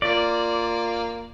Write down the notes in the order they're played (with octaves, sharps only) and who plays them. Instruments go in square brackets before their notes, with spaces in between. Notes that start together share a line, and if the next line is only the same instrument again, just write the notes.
[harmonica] A#3 [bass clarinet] F4 [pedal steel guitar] D5